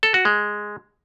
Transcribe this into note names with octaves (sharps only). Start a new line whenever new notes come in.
A4
F#4
G#3